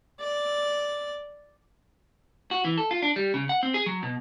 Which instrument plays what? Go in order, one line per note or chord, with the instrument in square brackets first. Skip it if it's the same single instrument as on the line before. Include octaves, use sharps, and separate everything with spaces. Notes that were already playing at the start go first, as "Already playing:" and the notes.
[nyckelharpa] D5
[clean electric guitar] F#4
E3
A4
F4
D4
G3
C#3
F#5
C4
G#4
F#3
B2